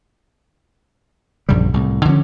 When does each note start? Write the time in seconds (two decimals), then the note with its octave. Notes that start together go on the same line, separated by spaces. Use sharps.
1.49 A#1 F#2 C#3 G3
1.74 C2 A2
2.05 D3 F3 A3 C#4